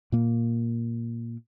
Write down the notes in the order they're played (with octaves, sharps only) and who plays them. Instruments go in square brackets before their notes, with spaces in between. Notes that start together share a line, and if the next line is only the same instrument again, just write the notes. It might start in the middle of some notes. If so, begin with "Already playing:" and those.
[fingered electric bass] A#2 A#3